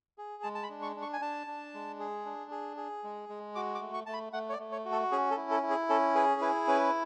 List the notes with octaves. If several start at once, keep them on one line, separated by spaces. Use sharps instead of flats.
G#4
G#3 A5
A5
B5
D4
C#6
D4
C#6
G#5
D4 A5
D4
G#3
G#4
D4
G#4
G#4
G#3
G#3
F#4 D6
D6
A3
C#6
A3 A5
B5
A3 F#5
C#5
D5
A3
C#5
F#4
A4
C#4 G#4
A4
E4
A4
E4
G#4
C#4 A4
G#4 B4
E4 B4
C#4 B4